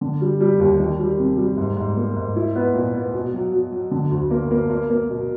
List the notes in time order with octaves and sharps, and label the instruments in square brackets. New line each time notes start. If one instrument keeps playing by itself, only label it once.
[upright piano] D3
G3
G3
D#2
D#3
G3
C3
G3
G#2
G#2
A#3
G#2
E4
B3
A#2
B3
B2
F#3
F#3
F#3
D3
D2
A#3
A#3
A#3
A#3
B2